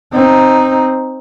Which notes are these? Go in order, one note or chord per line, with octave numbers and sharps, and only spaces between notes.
C4 D#4